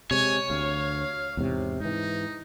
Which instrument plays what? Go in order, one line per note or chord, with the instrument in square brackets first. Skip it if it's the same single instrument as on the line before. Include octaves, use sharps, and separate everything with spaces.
[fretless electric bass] C3 G#3 [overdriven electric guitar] C#5 [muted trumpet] G#5
[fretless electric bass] D2 [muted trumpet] F5
[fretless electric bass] E2 G#2 C3
[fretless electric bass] G#2 E3 [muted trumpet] D#4